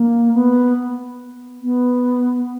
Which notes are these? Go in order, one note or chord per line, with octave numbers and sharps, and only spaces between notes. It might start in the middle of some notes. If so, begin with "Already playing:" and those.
Already playing: A#3
B3
B3